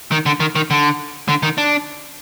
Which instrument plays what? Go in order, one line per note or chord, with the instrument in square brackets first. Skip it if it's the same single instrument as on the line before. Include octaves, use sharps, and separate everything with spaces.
[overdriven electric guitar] D#3
D3
D#3
D#3
D3
D3
D#3
D4